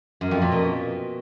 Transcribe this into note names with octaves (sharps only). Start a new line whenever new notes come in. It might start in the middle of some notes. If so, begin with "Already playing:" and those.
F#2
F2
A#2
B2